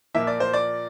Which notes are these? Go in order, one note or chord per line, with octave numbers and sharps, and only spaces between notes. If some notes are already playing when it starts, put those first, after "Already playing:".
A#2 F3 A#3 E5
D5
C5
D5